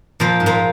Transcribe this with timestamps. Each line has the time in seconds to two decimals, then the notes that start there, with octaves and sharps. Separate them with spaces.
0.20 A#2 F3 A#3
0.40 G#2
0.46 A#2 A#3